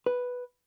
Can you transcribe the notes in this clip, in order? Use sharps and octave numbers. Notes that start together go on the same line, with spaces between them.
B4